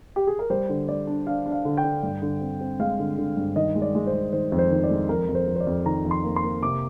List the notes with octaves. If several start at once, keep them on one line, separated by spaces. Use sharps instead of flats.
G4
G#4
A#4
G3 C5
D3
G3 D5
D4
D4 F5
D4
F5
D3
G5
D3
G2
D3
C4
C4
G#3 F5
D3
D3
G2
D#3 D#5
G#3
D5
G#3
C5
G#3
D#3 C5
F2
C5
D#3
D5
G#3
F2 A#4
F2
C5
F2
C5
D5
F2
D#3 A#5
F2
C6
A#3
C6
A#3
C3 D6